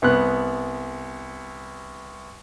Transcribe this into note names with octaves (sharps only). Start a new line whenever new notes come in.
C2 B3 F#6